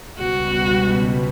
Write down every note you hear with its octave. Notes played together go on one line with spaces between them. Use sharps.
C#2 B2 G3 F#4